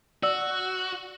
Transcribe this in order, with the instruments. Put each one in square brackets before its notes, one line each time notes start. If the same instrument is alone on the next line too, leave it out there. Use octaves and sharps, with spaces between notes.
[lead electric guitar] F#4 [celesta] D5 E6